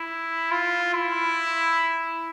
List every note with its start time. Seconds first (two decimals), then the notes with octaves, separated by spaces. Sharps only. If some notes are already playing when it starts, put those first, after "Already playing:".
Already playing: E4
0.51 F4
0.94 E4